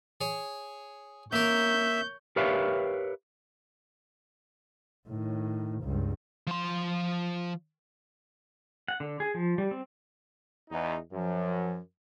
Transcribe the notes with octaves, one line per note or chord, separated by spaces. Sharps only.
G#4 C#5
A#3 A#4 C#5 E5 G6
G4 A#4 B4 C#5 E5 F5
A2 D#3
C#2 G2
F3 C6
F#5
D3
G#4
F3
G3
C4
E2 D#4
F#2 F3